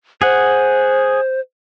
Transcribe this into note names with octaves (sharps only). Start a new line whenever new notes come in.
G#4 C5 F#5